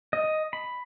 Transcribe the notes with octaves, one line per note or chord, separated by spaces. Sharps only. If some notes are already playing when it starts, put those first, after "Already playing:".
D#5
B5